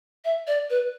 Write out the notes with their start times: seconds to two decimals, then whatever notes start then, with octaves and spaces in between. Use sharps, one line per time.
0.25 E5
0.47 D5
0.70 B4